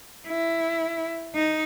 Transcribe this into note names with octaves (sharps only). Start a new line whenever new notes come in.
E4
D#4